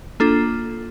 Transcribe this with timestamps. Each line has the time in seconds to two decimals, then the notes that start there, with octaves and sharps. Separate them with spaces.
0.20 A#3 D4 F4 A4